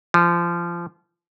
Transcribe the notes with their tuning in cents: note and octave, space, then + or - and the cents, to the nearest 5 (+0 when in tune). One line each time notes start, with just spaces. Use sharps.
F3 -25